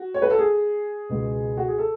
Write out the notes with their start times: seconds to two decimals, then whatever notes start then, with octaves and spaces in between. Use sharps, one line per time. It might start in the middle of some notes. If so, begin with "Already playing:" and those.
Already playing: F#4
0.14 C#5
0.22 B4
0.30 A4
0.39 G#4
1.09 C#2 B2 G#3
1.57 F#4
1.68 G#4
1.78 A4